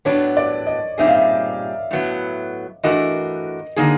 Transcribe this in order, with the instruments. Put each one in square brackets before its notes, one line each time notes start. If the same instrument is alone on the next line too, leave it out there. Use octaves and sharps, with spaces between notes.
[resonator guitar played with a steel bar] A2 F#3 B3 D4 [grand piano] C#5
[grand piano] D5
D#5
[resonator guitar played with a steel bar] A#2 G3 C4 D#4 G#4 [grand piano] E5
[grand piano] F5
E5
[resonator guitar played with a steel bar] A2 F#3 B3 E4
[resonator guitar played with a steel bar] E3 A3 D4 F#4 A#4 [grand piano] D#5
[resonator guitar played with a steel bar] D3 F#3 A#3 D#4 G#4